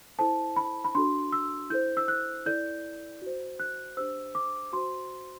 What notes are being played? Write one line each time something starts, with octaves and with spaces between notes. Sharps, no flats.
E4 A4 C5 A5
B5
B5
D4 F#4 A4 C6
E6
E4 A4 C5 G6
E6
F#6
E4 A4 D5 G6
F#4 C5
F#6
D4 G4 C5 E6
D6
F#4 C5 C6